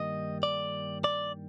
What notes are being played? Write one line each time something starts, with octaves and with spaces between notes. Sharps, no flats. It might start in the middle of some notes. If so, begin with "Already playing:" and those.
Already playing: G2 D#3 G3 A#3 D#5
D5
D5